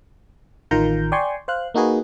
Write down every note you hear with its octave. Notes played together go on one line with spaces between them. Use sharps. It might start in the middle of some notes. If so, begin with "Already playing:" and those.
A1 D#3 F4 A#4 A#5 G6
D5 G5 G#5 C6 C#6
C5 F5 F#6
A#3 D#4 F#4 G#4 B4